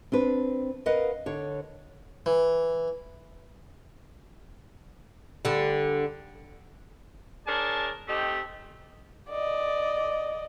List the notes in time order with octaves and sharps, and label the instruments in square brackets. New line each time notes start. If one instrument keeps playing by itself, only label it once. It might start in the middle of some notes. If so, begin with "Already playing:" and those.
[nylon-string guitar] C4 D4 B4
A#4 B4 D#5 F5 F#5
D3 C#5
[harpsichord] E3
[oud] D3 G3
[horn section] D4 G#4 A#4 C#5 D5 A5
A3 C4 D#4 G4
[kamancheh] D5 D#5